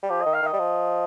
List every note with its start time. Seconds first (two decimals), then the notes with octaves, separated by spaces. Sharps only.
0.03 G3
0.09 F3 G4
0.21 D#3 D#5
0.34 F5
0.42 D#3 D#5
0.53 G3
0.59 F3